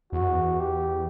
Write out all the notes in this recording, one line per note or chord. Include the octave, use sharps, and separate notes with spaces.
E2 F#4
F#2
E2
G4